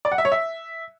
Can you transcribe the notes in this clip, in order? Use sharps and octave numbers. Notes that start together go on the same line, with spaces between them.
D5
F#5
E5
C#5
E5